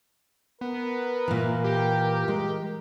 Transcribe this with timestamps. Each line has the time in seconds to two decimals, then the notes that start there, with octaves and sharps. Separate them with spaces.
0.61 B3 A#4
1.28 A#2 E3
1.64 G4
2.28 G#3